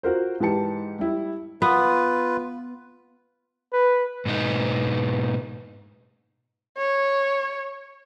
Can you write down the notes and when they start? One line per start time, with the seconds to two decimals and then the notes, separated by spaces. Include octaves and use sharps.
0.03 F4 F#4 A#4 C5
0.40 G#2 E3 G4 A5 C#7
0.99 G3 E4
1.62 B3 F4 B4
3.73 B4
4.26 G#2 B2 B3 D#4
6.78 C#5